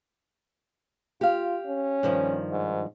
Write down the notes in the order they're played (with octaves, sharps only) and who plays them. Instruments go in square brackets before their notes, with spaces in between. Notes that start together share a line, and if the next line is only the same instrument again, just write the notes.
[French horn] F4 [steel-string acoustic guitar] G4 F5
[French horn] C#4
[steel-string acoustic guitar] G2 D#3 F3
[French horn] G#2